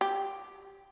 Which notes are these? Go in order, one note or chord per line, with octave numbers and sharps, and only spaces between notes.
G4